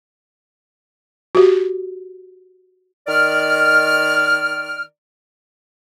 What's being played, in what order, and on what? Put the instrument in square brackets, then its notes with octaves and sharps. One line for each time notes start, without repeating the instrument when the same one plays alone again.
[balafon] F#4 G4
[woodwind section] D#3 D5 F6